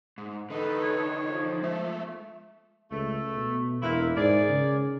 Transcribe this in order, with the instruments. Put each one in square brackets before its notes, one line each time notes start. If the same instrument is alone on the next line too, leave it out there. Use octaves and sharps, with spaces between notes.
[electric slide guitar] G#2
[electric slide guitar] D3 D#4 [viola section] A4 B4
[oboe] C#5
[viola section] F3
[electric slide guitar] G#3 A3 E5
[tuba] C#2 [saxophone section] A3
[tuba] B2
[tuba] E1 [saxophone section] A#2 A#3 E4
[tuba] G#2 [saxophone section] G#4 A#4 D5
[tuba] C#3